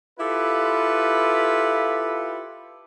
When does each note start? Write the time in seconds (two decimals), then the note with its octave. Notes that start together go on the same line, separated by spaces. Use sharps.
0.19 E4 F4 G4 A4 B4